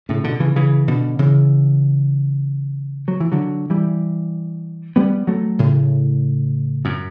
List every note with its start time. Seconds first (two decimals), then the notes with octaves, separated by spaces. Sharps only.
0.09 A2 C#3
0.24 B2 D3
0.40 C#3 E3
0.56 C#3 E3
0.88 B2 D3
1.19 C#3 E3
3.08 F#3
3.21 E3
3.32 D3 F#3
3.70 E3 G3
4.96 G3 B3
5.27 F#3 A3
5.59 A2 C#3
6.85 F#2